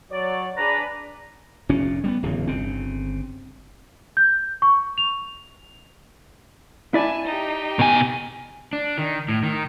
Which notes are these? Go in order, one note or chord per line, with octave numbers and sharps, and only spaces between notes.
F#3 C#5 D5
D4 G#4 B4 A#5
F1 A#2 C#4
G3 A#3 B3
D1 E2 C#3
G1 C#3 C4
G6
C#6
F7
E4 D5 G#5 A5
D#4 G4
B2 G#5
D4
D#3
A2
D#3